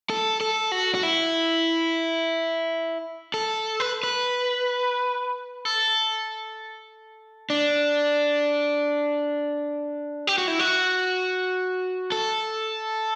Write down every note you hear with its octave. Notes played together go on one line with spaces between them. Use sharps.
A4
A4
F#4
F#4
E4
A4
B4
B4
A4
D4
G4
F#4
E4
F#4
A4